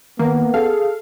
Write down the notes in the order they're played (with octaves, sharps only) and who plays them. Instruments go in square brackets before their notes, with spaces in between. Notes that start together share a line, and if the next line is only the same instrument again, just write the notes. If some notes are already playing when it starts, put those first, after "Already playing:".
[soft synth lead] D#3 [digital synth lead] A#3 [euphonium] B3
[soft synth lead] G#4 [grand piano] A4 [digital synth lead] F5